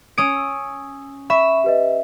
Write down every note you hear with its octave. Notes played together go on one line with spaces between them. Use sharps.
C#4 D#6 D7
E6
E5 B5 C#6
G4 B4 D#5